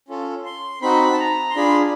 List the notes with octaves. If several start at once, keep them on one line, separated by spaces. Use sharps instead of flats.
C#4 F4 A4
C6
C4 D#4 F#4 B5
A5
A#5
C6
D4 F4 G#4 B5